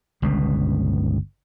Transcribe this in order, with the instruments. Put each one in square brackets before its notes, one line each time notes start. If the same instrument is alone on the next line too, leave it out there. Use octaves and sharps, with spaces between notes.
[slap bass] G1 C#2 G2 B2